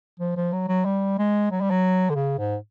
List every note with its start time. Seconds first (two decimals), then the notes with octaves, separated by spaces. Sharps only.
0.19 F3
0.36 F3
0.53 F#3
0.68 F#3
0.85 G3
1.18 G#3
1.51 F#3
1.61 G3
1.70 F#3
2.10 D3
2.15 C#3
2.38 G#2